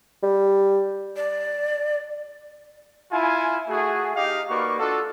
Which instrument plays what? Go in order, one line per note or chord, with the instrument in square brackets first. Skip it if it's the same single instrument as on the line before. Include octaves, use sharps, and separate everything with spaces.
[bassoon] G3
[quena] D5
[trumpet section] E4 F4 G#5
A3 F#4 G#4
D#4 G4 F5
A#3 D#4 F#4 B4 D5 C#6
D4 F4 F#4 A4